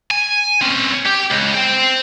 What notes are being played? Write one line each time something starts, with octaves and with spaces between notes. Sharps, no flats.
G#5
C4 C#4
G4
C#2
C5 G5